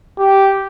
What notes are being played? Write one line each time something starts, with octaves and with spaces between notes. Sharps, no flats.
G4